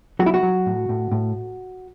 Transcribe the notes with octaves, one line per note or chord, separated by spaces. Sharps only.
F#3 F#4
E4
F#4
F#3
A2
A2
A2